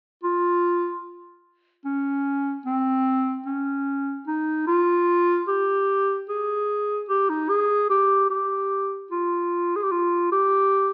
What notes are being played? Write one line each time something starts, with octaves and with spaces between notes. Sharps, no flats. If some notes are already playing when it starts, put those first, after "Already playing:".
F4
C#4
C4
C#4
D#4
F4
G4
G#4
G4
D#4
G#4
G4
G4
F4
G#4
G4
F4
G4